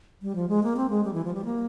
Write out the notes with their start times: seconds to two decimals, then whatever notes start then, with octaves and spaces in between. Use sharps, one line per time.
0.22 G3
0.36 F3
0.49 G#3
0.63 A#3
0.77 C4
0.90 G#3
1.04 G3
1.13 E3
1.25 F3
1.34 G3
1.45 A#3